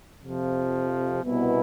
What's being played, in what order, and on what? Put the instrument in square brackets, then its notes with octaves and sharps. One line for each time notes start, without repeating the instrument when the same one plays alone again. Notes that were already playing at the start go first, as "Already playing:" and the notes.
[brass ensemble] F2 C3 F3
C2 B2 B3 E4